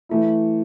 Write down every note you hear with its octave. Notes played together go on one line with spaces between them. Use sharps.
E3 A3 E4